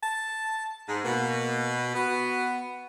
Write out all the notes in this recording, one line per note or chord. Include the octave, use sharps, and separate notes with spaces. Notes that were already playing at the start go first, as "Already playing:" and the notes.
A5
G#2
B2 A#3
B3 F#4